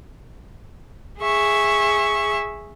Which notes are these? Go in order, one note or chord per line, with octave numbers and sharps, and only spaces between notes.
G#4 E5 C#6